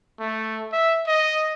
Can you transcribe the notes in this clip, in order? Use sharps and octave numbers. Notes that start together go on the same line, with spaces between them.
A3
E5
D#5